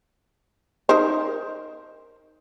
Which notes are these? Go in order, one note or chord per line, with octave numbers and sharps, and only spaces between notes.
D#4 A#4 C5